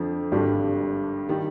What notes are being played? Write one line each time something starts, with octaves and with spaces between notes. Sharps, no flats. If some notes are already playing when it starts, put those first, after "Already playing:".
Already playing: F2 D3 F3
G#1 G2 D3 G3 D4
D#3 G3